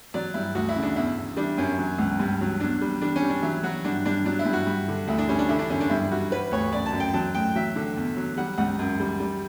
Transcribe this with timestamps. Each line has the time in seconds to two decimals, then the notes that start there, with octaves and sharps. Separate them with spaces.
0.14 F#3 D5
0.34 G2 E4
0.55 D2 F#4
0.69 E4
0.76 C#3
0.83 D4
0.96 E2 E4
1.17 E2
1.37 G3 D4
1.57 F#2 C#4
1.78 F#3
1.98 C#2
2.20 G2
2.41 F#3
2.60 E2 D4
2.81 G3
3.01 G3 D4
3.16 C#4
3.22 G3
3.30 D4
3.43 F#3 E4
3.63 F#3 F#4
3.85 G2 D4
4.06 G2 D4
4.26 F#3 D4
4.39 E4
4.46 G2
4.53 F#4
4.66 G2
4.88 D3
5.07 D2 E4
5.18 D4
5.29 G3 C#4
5.39 D4
5.49 D3 E4
5.59 D4
5.70 F#2 C#4
5.81 D4
5.90 G2 E4
6.11 G3 F#4
6.31 G3 B4
6.52 D2 C#5
6.72 F#2 D5
6.86 A5
6.93 F#2
7.00 G5
7.14 F#3 A5
7.35 A2 G5
7.55 F#3 E5
7.75 D3
7.96 E2
8.17 F#3
8.37 G3 F#5
8.58 C#2 F#5
8.79 F#2
9.00 G3
9.20 G3